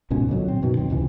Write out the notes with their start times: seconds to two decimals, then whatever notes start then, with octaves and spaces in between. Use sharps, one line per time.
0.10 C#2 G#2 B2 C#4
0.28 A#2 D3 E3 F#3
0.48 C4
0.62 F#2 B2 D#3 F#3
0.77 D#2 C4
0.90 C#2 C3 E3